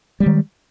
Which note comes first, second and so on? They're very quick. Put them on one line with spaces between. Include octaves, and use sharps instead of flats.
G3 G#3 D#3